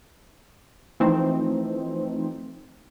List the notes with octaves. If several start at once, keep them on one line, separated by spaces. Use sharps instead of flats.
E3 F3 A3 C4 D#4